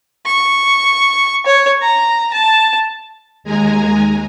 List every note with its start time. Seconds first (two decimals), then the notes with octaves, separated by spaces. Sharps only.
0.26 C#6
1.46 C#5
1.82 A#5
2.33 A5
3.44 D#2 G#3 G#5 A#5